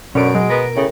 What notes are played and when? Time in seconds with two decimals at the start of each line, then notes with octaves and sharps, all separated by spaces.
0.15 F#2 B2 D3 C#4 D7
0.35 F#3 G#3
0.50 B3 A#4
0.76 A2 C#3